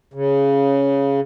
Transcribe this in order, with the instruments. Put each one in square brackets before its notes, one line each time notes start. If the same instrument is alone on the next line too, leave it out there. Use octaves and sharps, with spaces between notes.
[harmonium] C#3